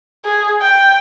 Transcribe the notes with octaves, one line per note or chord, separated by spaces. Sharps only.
G#4
G5